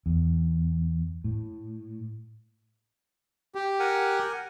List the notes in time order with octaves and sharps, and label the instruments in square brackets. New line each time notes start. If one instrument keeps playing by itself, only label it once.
[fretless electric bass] E2
A2
[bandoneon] G4
[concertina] A#4 F#5 G#5